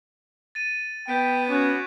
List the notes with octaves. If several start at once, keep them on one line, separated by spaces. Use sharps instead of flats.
A6 D#7
B3 G5 G6 B6 D7
C#4 F#4 D6 F#6 G#6